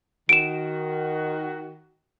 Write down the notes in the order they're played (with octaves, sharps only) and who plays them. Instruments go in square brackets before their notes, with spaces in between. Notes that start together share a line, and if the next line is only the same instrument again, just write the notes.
[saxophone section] D#3 F#4 [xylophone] D7 E7